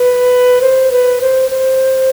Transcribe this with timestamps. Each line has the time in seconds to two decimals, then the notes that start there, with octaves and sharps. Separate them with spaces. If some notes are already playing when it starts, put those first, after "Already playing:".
Already playing: B4
0.61 C5
0.91 B4
1.21 C5
1.51 C5